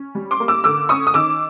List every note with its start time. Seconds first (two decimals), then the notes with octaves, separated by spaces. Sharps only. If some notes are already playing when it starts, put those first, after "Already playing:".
Already playing: C#4
0.15 G3
0.31 C6 D6
0.40 A#3
0.48 D6 E6
0.64 D3 D6 E6
0.89 C#4 C#6 D#6
1.07 D#6
1.14 D#3 D6 E6